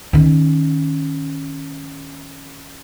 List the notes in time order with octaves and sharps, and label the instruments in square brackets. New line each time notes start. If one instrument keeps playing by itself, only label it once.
[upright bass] D#3 C#4